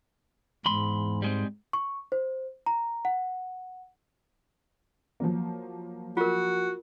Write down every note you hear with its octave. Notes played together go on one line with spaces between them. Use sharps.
E2 G#2 B5 C6
G3 G#3 C4
C#6
C5
A#5
F#5
F3 F#3 A#3
F4 F#4 A#4